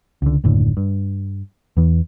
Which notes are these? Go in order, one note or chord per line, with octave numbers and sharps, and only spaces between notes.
C#2 D3
F#1 D#2 A2 D3
G2
E2 E3